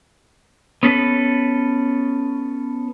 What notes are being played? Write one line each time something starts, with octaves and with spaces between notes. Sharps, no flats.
B3 C#4 A4 B4